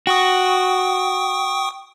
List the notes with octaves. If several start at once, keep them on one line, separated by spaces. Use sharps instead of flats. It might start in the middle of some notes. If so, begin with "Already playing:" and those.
F#4 G5 C#6 D#6